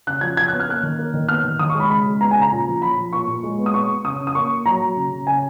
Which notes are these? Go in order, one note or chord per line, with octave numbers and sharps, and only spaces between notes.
C#3 F#6
F3 G#6
C#3 G#6
B3 F#6
F6
A#3 F#6
D#3
A#3
D#3
B3 F6
D#3
D#3 D#6
C#6
G#3 B5
C#3 B5
G#3
B3 A#5
C#3 G#5
A#5
A#2
F3
F3 B5
F3
A#2 C#6
A#2
G#3
B3
D#6
B3 C#6
B3
C#3 D#6
C#3
D#6
A#3 C#6
A#3
F#3 A#5
F#3
C#3
C#3
C#3 G#5